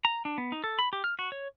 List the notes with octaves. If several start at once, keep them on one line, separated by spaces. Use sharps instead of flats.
A#5
D4
B3
D#4
A4
B5
G4
F6
F#4
C#5